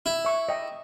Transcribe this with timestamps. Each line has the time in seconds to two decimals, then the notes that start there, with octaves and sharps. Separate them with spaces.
0.06 E4
0.25 E5 C#6
0.49 D#5 G5